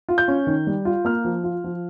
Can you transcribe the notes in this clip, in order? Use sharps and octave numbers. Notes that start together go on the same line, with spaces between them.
F4
G6
C#4
D#3
G3
F4
A#3 F6
F3
F4
F3